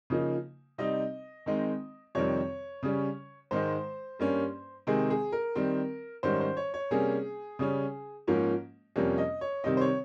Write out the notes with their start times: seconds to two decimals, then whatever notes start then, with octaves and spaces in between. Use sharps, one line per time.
0.10 C#3 F3 A#3 D#4
0.78 C3 G3 C4 D#4 D#5
1.46 D#3 G#3 C4 D#4
2.15 F2 C3 D#3 G3 C4 C#5
2.83 C#3 G3 C#4
3.51 G#2 D#3 G#3 C5
4.19 G2 G3 A#3 C#4
4.87 C3 D#3 G#3 C4 G#4
5.10 G#4
5.32 A#4
5.56 D#3 G3 C4
6.23 G#2 D#3 G3 C#4 C5
6.41 C5
6.57 C#5
6.74 C#5
6.91 C3 G3 A#3 C#4 G#4
7.59 C#3 G3 C#4
8.27 G#2 F3 A#3 C#4
8.96 F2 C3 G3 A#3 C#4
9.18 D#5
9.41 C#5
9.64 C3 D#3 G3 C4 D#5
9.77 C5
9.81 C#5